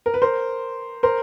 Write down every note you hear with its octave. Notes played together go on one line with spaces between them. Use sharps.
A#4
B4
A#4 C5
A#4 C5